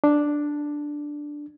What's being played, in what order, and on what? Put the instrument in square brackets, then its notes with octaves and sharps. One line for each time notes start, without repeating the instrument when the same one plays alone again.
[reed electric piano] D4